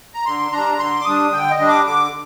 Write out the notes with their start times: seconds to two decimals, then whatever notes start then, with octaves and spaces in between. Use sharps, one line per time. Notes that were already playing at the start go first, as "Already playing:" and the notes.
0.14 A#5
0.26 D3 C6
0.52 G3 D4 A#5
0.79 D3 C6
1.01 D6
1.05 G3 D4 D#6
1.32 D3 G5
1.50 D#5
1.60 G3 D4
1.68 D6
1.86 D3 D6